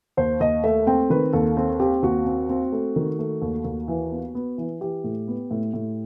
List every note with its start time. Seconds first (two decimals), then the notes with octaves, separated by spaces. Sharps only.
0.17 D#2 C5
0.40 D#2 D#5
0.63 A3 E5
0.87 C4 G5
1.10 D#3 B4
1.33 D#2 A4
1.57 C4 A4
1.80 C4 G4
2.03 D#2 F#4
2.26 C4
2.49 C4
2.72 A3
2.96 D#3
3.19 A3
3.42 D#2
3.65 D#2
3.88 E3
4.12 B3
4.35 B3
4.58 E3
4.81 E3 G4
5.04 A2
5.28 B3
5.51 A2
5.74 A2